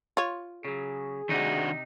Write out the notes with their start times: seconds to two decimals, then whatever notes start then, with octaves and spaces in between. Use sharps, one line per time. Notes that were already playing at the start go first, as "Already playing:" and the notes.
0.17 F4 C#5
0.65 C#3 F#3 G#4
1.29 C3 D#3 D4 D#4 F#4